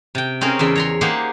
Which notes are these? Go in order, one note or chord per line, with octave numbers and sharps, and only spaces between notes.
C3 G5
C4 C#4 D#4 G#4 A#4 F5
E2 C#3 C#4 D5 E5 C6
C#5 A#5 C6
A#3 D#4 G4 G#4 C5 F#5